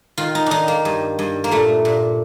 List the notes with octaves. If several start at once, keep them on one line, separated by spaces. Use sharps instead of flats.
D#3 F4
D#4
D#3 D4 D#4
A#3
G2
G2
A#3
A#2 A3
A#2